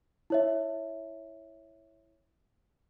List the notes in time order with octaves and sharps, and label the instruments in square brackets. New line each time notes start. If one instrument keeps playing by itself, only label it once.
[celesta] E4 C#5 E5